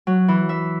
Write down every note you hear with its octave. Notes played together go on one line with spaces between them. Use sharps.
F#3
E3
E5